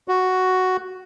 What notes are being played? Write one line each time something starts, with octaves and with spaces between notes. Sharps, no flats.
F#4